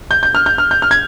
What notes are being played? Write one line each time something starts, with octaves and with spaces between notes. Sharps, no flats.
G6
G6
F6
G6
F6
G6
F6
G#6